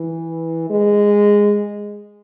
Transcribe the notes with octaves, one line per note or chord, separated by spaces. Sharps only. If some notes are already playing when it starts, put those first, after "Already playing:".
Already playing: E3
G#3